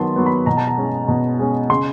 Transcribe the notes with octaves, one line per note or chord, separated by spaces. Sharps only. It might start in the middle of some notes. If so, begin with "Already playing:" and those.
Already playing: D#3 F#3 B3 A5 C6
F#3 B3
B5
B2 A#5
A5
A#5
G#3 C#4
B2
G#3 C#4
C#3 C6